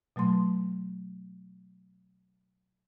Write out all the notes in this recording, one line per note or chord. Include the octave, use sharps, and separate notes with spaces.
B2 F#3 A3 C6